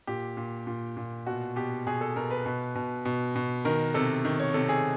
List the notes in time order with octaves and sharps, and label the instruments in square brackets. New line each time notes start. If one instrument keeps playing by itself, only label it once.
[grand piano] A#2 G4
A#2
A#2
A#2
B2 F#4
B2 G4
B2 G#4
A4
B2 A#4
B4
B2
B2
B2
B2
D#3 A#4
C3 A4
D#3
C#5
C3 A4
G#4